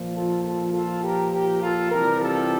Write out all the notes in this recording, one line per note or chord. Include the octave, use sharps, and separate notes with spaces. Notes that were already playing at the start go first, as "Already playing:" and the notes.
Already playing: A#2 F3
F4 A4
F4 A4
F4 A4
G4 A#4
G4 A#4
F4 A4
C3 E3 G3 G4 A#4
F4 A4